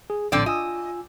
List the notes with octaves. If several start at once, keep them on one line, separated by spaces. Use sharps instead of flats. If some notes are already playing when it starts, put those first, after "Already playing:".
G#4
A#1 A2 D3 C4 D5
F4 D#5 G#5 E6